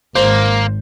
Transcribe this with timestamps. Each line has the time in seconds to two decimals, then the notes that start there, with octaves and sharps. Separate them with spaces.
0.15 G#1 A#3 C5